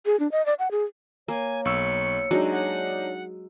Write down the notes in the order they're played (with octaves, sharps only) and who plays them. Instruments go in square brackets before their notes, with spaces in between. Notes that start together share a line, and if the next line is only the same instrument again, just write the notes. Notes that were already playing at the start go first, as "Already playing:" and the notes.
[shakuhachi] G#4
D4
D#5
D5
F#5
G#4
[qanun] A#3 [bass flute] C#5 [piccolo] G#5
[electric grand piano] B1 C#6 E6 [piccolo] C#7
[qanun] F#3 G#3 [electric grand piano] D4 D#4
[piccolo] F#5